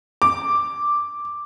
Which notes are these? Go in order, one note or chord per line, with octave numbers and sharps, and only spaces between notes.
D6